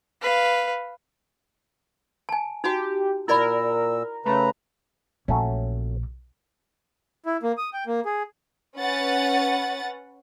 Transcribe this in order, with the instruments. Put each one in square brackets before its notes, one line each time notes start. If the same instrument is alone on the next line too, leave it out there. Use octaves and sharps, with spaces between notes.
[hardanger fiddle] B4 F5
[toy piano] G#5 A5
[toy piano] D#4 F#4 [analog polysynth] G4
[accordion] A#2 E6 [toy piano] E4 D5 B5 [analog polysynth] A#4
[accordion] C#3 B4 A#5 [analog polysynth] A3
[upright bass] A#1 [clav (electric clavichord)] F#3 A3 C#4
[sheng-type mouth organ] E4
A#3
D#6
G5
A#3
G#4
[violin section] C#4 B4 F#5 A6